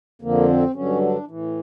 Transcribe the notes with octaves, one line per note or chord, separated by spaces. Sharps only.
F2 D3 F3 A#3
C4
G2 D3 F#3 C#4
D4
A2 E3